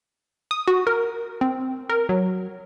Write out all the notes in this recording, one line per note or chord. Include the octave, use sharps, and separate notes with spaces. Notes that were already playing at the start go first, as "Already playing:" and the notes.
D#6
F#4
A#4
C4
A#4
F#3